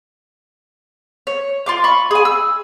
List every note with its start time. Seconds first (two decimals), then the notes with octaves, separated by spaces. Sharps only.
1.27 C#5
1.66 F4 C6 D6
1.84 B5 C#6
2.11 G#4 G#5
2.25 E6